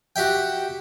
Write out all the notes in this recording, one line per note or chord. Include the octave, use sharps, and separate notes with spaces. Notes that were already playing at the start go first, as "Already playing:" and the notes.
F#4 G4 E5 G5